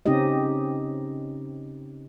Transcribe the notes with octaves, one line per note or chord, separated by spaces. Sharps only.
C#3 C4 C#4 D#4 G4 D#5